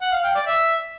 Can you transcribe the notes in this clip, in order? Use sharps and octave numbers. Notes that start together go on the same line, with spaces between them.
F#5
F5
G5
D5
E5